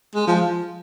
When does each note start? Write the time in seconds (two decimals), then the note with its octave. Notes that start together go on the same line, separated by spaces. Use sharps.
0.15 G#3
0.27 F3